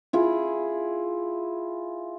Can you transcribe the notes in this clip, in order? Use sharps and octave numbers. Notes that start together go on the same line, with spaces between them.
E4 F4 G#4